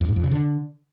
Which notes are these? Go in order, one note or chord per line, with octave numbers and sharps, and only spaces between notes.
F2
G#2
F2
C#3
D3